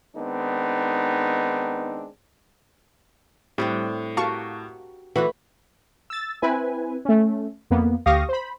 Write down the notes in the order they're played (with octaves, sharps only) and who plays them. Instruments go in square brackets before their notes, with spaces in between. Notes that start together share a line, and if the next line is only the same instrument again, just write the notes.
[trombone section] D#3 G#3 B3 C4 D4 D#4
[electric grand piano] A2 [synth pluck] G3 [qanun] C4 D4 A4
[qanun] F#4 G4 A#4 [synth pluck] F5 A5 C#6
[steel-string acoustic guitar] E3 [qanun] A3 E4 B5 [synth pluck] F#4
[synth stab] E6 A6
C4 E4 B4 G#5
A3 C#4
F2 A#3 B3
D2 G4 F5 C#6 D#6 A#6
C5 B5